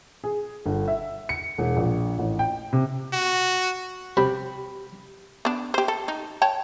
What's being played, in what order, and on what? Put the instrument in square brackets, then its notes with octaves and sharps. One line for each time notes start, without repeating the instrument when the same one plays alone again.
[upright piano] G#4
G1
E5
C#7
E1
A#1
A1
G5
C3
[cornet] F#4
[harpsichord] C3 [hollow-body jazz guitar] G4 B5
[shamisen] B3 D4
G4 C5
A4
D#4
C#5 G5 A5